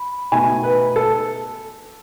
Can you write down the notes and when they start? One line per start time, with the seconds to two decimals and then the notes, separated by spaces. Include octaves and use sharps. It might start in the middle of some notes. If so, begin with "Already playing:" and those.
Already playing: B5
0.32 B2 A3 D#4 G#5
0.63 B4
0.96 A4